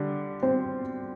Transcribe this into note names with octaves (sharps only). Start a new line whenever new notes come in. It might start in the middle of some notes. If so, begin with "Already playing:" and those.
Already playing: D3 G3 D4
C4 C5